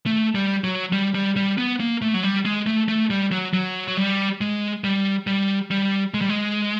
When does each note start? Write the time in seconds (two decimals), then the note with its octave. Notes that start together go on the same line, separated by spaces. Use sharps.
0.06 A3
0.35 G3
0.64 F#3
0.93 G3
1.15 G3
1.36 G3
1.58 B3
1.80 A#3
2.02 A3
2.14 F#3
2.23 G3
2.45 G#3
2.67 A3
2.88 A3
3.10 G3
3.32 F#3
3.54 F#3
3.88 F#3
3.97 G3
4.41 G#3
4.84 G3
5.27 G3
5.71 G3
6.14 G#3
6.22 G3
6.29 G#3